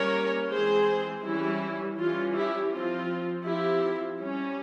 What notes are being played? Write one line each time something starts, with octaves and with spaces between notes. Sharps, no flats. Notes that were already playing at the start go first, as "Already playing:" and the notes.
Already playing: G3 A#3 C#4 A#4 C#5
E3 G#3 C4 G#4 C5
E3 G3 C#4 E4
E3 G3 C#4 F4
E4 G4
F3 C4 F4
F3 C4 E4 G4
G3 C#4